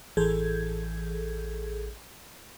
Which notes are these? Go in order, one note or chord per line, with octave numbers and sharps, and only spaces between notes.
A1 E3 G#4 A4 G6 G#6